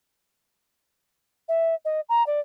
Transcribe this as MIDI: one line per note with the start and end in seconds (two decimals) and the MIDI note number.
1.48 1.75 76
1.85 2.01 75
2.09 2.25 82
2.27 2.40 74